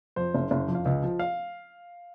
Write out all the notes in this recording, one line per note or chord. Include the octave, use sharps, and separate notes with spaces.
F2 C5
F#1
F#1
F2
F5
C#2 D#5
F3
F5